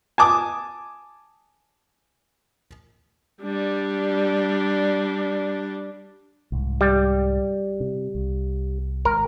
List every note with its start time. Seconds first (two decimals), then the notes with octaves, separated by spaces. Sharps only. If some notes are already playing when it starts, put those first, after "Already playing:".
0.18 G#5 A5 D6 D#6
3.43 G3 D4
6.52 C2 G#2
6.81 G3
7.80 C3
8.15 C2
9.05 G#1 G#2 A#4